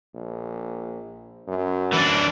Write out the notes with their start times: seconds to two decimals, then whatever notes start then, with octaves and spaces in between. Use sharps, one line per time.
0.14 A#1
1.48 F#2
1.93 E3 D4